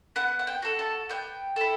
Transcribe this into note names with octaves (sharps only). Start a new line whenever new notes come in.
B3 F#5
F#5
G5
F#4 A4
A5
B3 G5
E4 A4